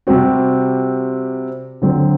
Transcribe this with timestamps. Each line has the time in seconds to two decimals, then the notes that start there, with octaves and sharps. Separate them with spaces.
0.07 C3 G3 C4 F#4
1.82 D3 F#3 C4